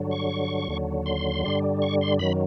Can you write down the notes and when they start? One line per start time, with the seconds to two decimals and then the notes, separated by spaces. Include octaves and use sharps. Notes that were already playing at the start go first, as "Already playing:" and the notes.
Already playing: G2 D3 F#3
0.11 C#6
0.68 D#2 D3 F#3
1.06 C6
1.44 G2 D3 G3
1.82 C#6
2.01 C6
2.19 F#2 D#3 F#3 B5